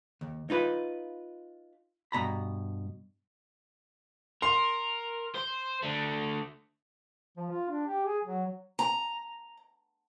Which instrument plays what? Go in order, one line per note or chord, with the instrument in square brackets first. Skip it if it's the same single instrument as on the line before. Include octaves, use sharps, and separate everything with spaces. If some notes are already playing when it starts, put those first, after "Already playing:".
[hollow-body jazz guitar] D#2
D#4 F4 B4
G2 B2 A#5 B5
[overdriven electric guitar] A#4 [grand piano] C6
[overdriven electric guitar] C5
D3 A3
[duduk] F3
F4
D4
G4
G#4
F#3
[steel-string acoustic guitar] A#5